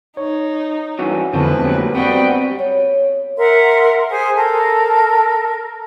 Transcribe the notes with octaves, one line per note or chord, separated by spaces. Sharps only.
D#4 C#5
G2 E3 C#4 F#4
F2 B2 D3 E3 F3 G#3 B4 A5
D2 A#2 F#3 G4
G3 B3 C4 F#4 G5
C#5
A#4 E5 F#5 C6
G#4 C5 G#5 D#6
A4 A#4